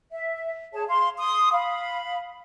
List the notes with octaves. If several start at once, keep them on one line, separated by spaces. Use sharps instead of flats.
E5
G#4 C#5 A5
F5 C6
C6 D#6
F5 B5